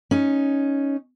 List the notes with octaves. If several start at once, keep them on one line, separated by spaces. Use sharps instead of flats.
C#4 D#4